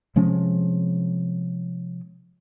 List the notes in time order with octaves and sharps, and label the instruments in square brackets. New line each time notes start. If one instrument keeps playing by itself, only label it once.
[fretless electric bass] C3 F3 G#3 C#4